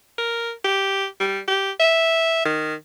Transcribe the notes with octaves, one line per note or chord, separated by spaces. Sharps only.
A#4
G4
G3
G4
E5
D#3